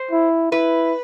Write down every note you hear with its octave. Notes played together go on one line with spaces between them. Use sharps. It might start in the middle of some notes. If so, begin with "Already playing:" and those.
Already playing: C5
E4
E4 B4